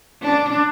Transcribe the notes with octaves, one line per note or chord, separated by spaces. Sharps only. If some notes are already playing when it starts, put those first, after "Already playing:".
D4